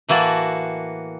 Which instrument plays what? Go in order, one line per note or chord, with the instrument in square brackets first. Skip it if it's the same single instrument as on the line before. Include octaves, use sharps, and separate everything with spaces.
[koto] A2 E3 A#3 F#4 A5